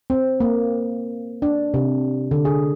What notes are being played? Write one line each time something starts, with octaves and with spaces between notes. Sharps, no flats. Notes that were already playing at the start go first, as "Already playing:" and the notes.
C4
A#3
D4
C3
D3
G#4